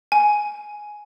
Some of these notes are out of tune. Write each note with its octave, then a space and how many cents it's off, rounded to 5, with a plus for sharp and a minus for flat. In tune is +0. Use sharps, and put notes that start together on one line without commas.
G#5 +5